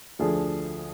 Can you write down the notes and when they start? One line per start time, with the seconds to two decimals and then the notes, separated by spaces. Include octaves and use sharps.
0.19 D2 D3 F3 A3 D4 G#4